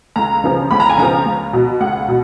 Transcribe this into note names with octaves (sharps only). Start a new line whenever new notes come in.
C#2 A#5
C#3 F3
C#2 B5
A#5
G#5
C#3 F3 A#5
C#2
B2
C#2 F#5
B2